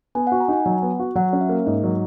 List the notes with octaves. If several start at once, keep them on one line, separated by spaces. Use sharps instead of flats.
B3 G#5
F#5
F#4
A#5
D#4 G#5
F#3 F#5
B3
F#4
F#3 F#5
C#4
E5
A#3
G#2 D#5
F#3